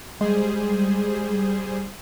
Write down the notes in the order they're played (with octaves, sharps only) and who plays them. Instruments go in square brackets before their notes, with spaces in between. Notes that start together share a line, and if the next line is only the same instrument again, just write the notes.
[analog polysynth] G3 G#4 C5 [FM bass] G#3